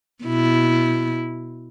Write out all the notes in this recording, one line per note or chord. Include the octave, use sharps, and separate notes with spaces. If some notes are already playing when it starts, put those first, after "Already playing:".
B2 E4